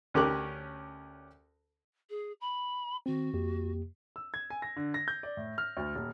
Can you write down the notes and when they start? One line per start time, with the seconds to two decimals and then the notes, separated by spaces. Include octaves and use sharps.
0.14 D2 C#4 G4 A#4 D6 F#6
2.10 G#4
2.41 B5
3.06 D#3 C4 F#4
3.34 F2 A#3 G4
4.16 E6
4.34 G#6
4.50 G#5
4.62 A#6
4.77 D3
4.94 A#6
5.08 G6
5.23 D5
5.37 A2
5.58 F6
5.77 D2
5.95 D#1